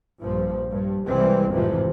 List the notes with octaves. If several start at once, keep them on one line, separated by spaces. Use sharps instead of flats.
A#1 G2 F3
G2
C2 E3 G3 G#3 C4
G#1 F2 A2 C3 E3 F3